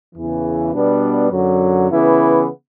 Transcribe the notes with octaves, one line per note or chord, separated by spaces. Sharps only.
E2 C#3 E3
B2 G3 B3 D4
F#2 D3 F#3
C#3 E3 B3 E4